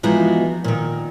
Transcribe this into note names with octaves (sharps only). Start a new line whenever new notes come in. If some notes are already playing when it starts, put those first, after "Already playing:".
E3 F3 G#3 B3 D#4 F#4
A#2 D#3